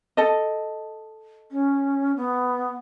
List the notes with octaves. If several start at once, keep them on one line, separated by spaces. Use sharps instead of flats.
A4 D#5
C#4
B3